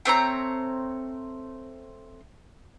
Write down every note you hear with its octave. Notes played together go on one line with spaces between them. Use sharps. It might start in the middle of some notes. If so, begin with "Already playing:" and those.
A3 C4 C#5 A#5